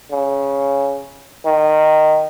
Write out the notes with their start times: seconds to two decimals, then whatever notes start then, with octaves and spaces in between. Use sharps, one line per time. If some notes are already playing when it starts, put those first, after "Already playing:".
0.11 C#3
1.45 D#3